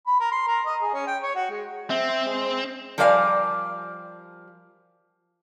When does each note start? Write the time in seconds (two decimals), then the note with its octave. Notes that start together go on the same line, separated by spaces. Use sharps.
0.07 B5
0.20 A#4
0.32 C6
0.47 A#4
0.66 D#5
0.82 G#4
0.94 C#4
1.07 G5
1.23 C#5
1.35 F#4
1.50 G#3
1.90 C4 E5
2.26 G#3
2.98 F3 G3 A#4 D5 F5 G#5